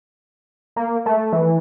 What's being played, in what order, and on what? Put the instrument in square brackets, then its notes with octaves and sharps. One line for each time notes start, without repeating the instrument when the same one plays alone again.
[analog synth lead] A#3
A3
E3